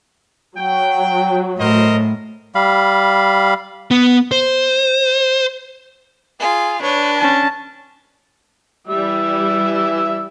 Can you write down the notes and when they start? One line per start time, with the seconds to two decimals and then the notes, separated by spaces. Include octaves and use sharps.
0.58 F#3 G5
1.58 A2 A#4 C5 D#5
2.55 G3 F5 B5
3.91 B3
4.32 C5
6.40 F4 G#4
6.82 D4 B4 C#5
7.19 C#4 A5
8.88 E3 G3 E5 E6